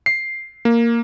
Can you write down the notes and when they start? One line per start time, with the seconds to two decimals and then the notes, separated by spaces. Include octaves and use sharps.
0.06 C7
0.65 A#3